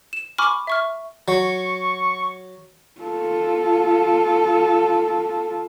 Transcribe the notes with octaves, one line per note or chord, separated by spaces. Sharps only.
E7
G#5 B5 C#6 D6 F6
E5 C#6 F6
F#3 C#6
F4 A4